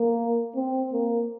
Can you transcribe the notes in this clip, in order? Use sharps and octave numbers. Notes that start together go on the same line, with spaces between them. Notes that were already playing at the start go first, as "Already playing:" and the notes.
Already playing: A#3
C4
A#3